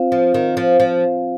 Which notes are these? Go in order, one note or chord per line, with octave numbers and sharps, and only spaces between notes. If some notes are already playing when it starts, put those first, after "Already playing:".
Already playing: C4 F4 C5 F5
F3
D#3
F3
F3